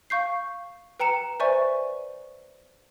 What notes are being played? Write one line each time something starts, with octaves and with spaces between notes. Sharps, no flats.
F5 C#6 G6 C7
B4 G5 A#5 C#7 E7
B4 C5 D5 E5 G#5 C#6